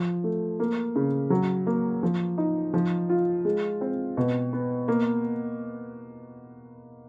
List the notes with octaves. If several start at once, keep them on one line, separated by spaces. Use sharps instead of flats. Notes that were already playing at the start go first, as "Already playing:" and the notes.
Already playing: F3
A3
A#3
C#3
F#3
A#3
F3
D#4
F3
F4
G#3
C4
B2
B3
A#3